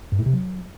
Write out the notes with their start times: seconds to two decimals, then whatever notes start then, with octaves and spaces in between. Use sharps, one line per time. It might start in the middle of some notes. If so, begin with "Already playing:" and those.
0.12 G2
0.19 A2
0.26 C3
0.33 F#3